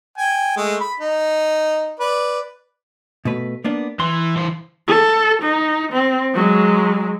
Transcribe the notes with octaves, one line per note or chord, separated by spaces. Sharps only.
G5 G#5
G#3 A3
B5
D#4
B4 D5
B2 A3 B4
A#3 B3 D4
E3 C6
E3 C5
A4
D#4
C4
F#3 G#3